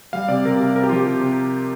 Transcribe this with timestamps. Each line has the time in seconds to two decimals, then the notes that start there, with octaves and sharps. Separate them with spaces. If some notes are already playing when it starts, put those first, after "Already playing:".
0.13 G3 F5
0.28 C3 D5
0.45 C3 A#4
0.60 C3
0.75 C3 A#4
0.83 G4
0.89 F3 F4
0.96 G4
1.07 C3
1.21 C3